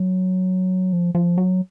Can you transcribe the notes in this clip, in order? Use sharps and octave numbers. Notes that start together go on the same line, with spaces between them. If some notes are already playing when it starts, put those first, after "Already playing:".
Already playing: F#3
F3
F3
F#3